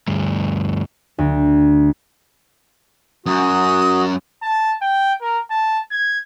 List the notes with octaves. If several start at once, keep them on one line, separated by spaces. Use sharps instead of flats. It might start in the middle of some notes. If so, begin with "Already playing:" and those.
D2 G2
D2
F#2 F#4 D#6
A5
G5
A#4
A5
G#6